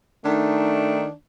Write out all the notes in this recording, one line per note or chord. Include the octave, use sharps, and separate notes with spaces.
D#3 A3 D4 D#4